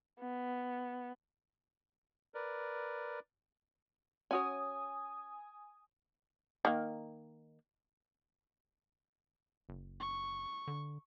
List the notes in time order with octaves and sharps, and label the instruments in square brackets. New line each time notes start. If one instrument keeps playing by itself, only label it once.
[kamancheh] B3
[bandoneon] A#4 B4 D5
[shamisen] C#4 F#4 C#5 [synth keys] G#5 D#6
[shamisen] D#3 A#3
[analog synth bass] F#1
[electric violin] C#6
[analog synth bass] D3